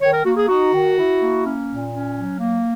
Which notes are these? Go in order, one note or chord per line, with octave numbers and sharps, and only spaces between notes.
D#3 C#5
A#4
A#3 F#4
G#4
D#4 F#4
D#3
E4
A#3
C#4
A#2
C#4
F#3
A#3